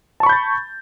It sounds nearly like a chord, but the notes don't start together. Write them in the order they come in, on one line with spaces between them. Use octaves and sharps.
A5 C#6 B5 G6 A6